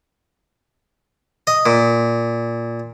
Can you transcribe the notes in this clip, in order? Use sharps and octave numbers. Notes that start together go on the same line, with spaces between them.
D#5
A#2